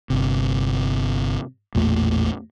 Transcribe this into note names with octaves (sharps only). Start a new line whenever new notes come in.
G1 C3
A1 E2 A#2 A3